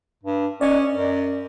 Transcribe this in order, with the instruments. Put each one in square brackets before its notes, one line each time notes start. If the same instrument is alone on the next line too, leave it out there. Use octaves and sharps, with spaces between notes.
[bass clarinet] G2
[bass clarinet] C#4 [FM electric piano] D5 D#5
[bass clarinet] F#2